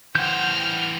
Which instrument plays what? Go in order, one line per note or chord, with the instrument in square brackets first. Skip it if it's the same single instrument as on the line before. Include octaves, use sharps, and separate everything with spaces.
[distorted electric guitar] E3 C5 [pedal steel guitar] F#5 G6 [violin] G5 F6